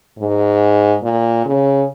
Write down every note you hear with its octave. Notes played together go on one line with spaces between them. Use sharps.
G#2
A#2
C#3